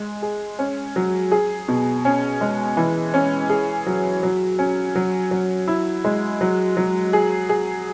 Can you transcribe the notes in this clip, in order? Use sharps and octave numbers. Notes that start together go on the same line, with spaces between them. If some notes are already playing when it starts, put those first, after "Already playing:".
Already playing: G#3
G#4
C#4
F#3
G#4
B2
C#4
G#3
E3
C#4
G#4
F#3
F#3
C#4
F#3
F#3
E4
G#3
F#3
F#3
G#4
G#4